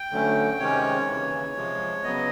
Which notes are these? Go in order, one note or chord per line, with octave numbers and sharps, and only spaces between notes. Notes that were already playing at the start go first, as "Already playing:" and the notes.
Already playing: G5
D2 D3 F#3 A3 C#4
C3 D#3 G#3 C#4 C#5
D#2 C#3 E3
C3 F3 G#3
C#3 F#3 B3 D#5